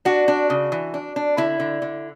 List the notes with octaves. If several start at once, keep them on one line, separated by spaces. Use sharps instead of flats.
D4 F#4
D4
C#3
E3
D4
D4
D3 E4
D3
D3